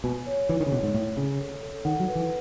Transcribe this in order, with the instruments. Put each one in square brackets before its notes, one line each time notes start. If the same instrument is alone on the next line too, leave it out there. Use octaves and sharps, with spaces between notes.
[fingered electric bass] B2 [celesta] G#5
[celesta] C#5
[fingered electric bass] E3 [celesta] C#5
[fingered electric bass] D#3
C#3
[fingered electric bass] B2 [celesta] C#5
[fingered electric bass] G#2
[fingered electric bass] A2 [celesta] E5
[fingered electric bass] C#3 [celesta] E5
[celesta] A4
A4
[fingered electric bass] D#3 [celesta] F#5
[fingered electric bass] F#3
[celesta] B4
[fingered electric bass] E3